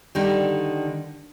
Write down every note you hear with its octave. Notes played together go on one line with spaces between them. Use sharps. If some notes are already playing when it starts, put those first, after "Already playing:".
D3 D#3 G3